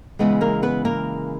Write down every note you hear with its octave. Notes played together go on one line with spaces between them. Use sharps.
C#3 E3 G#3 B3 B4
A#3 A#4
B3 B4
A#3 A#4